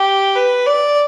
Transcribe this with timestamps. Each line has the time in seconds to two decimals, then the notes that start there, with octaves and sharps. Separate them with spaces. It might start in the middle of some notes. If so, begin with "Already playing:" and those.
Already playing: G4
0.35 B4
0.66 D5